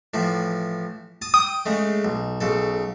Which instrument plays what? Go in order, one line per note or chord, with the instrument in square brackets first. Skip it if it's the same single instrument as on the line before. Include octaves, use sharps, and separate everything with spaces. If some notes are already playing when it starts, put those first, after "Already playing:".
[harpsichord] A2 E3 F3
A5 D#6
[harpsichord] G5 [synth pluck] D#6
[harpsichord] C#3 G#3 A3
B1
B1 C#3 A4